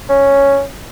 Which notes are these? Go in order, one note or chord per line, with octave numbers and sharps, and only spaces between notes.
C#4